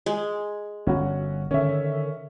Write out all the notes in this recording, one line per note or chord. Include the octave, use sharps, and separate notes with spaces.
G#3
G1 C#4 F#4
D3 D#3 C#4 E5